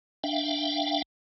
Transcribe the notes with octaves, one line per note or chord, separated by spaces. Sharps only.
D4 E5 F5 G5